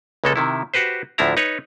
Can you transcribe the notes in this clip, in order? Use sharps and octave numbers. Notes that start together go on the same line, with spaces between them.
C#2 C#3 G#3 A#3 A4
C3 D#3 E4
F#4 G4 B4 C5
D2 A2 F3 D4 E4 A#5
D#4 B4 C#5